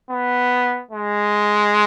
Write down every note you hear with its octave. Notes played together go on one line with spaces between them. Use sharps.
B3
G#3